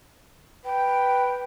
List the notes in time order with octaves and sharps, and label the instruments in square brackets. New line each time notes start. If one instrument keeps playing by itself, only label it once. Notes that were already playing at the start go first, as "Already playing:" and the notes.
[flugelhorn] B4 [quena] G5